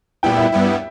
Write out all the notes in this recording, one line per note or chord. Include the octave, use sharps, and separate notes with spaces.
A#2 G3 B3 E4 G5
E5
G2 G3 B3 E4